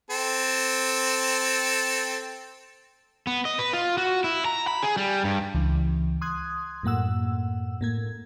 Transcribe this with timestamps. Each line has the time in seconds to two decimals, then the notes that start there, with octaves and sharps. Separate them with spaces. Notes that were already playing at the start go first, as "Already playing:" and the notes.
0.10 C4 A4
3.27 B3
3.45 D#5
3.59 B4
3.73 F4
3.98 F#4
4.24 E4
4.45 A#5
4.67 B5
4.83 G#4
4.97 G3
5.24 G2
5.54 C#2 E3
6.21 C6 D#6 F#6 G#6
6.83 F#2 A2 A#3 F#5 E6
7.81 A2 A#3 G#6